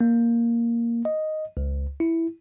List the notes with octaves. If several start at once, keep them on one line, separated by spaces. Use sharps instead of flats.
A#3
D#5
C#2
E4